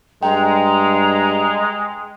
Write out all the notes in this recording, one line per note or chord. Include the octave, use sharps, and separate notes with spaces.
G2 G#3 G5 A#5